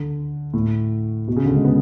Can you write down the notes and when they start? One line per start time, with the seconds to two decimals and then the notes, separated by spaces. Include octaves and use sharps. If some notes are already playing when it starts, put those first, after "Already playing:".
Already playing: D3
0.54 A2
1.28 B2
1.36 C#3
1.46 D3
1.55 G#3
1.65 B3